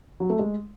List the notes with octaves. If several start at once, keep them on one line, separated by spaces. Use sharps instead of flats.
F#3
A3
G#3